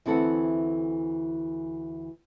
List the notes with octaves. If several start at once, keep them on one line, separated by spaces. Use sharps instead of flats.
D2 E3 C4 E4 A4 F#5